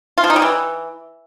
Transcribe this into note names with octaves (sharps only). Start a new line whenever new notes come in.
F4
F3
D#4
G3
E3